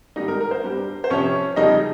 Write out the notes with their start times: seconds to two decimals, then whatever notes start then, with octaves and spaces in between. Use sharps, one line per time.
0.16 G#2 D#3 G3 D#4 D#5
0.28 A#4
0.40 A#4
0.51 C5
0.64 G2 G3
1.04 C5
1.10 F2 C3 F3 C#4 C#5
1.56 F2 C#3 G3 D#4 D#5